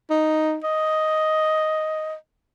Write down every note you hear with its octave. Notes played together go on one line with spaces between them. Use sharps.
D#4
D#5